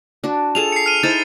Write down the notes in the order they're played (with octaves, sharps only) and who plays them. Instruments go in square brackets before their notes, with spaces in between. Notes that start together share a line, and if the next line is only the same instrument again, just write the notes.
[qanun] D4 F#4
[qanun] F4 G#4 A4 [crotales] F7
[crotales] C7 C#7
F6 D#7
[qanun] D#4 E4 C5 [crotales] A6